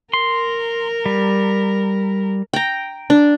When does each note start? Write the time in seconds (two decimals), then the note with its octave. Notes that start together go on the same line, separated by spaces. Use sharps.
0.13 A#4 C6
1.06 G3
2.53 G5 A#5
3.10 D4